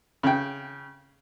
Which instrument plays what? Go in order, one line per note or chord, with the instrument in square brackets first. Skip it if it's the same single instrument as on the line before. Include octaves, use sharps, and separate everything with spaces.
[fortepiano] C#3 G5